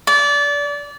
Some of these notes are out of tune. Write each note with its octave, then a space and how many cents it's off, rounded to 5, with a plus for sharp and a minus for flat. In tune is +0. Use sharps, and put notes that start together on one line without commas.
D5 -25